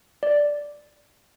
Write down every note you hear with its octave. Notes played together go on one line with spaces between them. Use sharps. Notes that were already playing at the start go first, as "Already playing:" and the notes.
D5